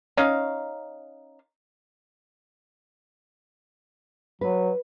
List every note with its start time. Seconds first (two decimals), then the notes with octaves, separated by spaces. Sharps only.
0.17 C#4 D#4 F5
4.41 F#3 B4